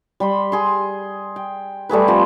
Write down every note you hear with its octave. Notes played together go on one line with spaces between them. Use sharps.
G3 B5 C6
G#4 C6
G5
G3 A3 G#4 B4
F3 C4